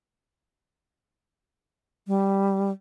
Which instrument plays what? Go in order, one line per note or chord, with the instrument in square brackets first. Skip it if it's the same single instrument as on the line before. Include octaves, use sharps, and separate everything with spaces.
[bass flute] G3